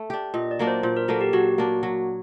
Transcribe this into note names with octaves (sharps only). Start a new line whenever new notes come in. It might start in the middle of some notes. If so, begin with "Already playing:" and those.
Already playing: A3
D4 G4
A#2 D#5
D5
F#3 A#3 D4
C5
A#2 C5
A#4
F#3 A#3 D4 A4
G4
F#3 F#4
A#3 D4
F#3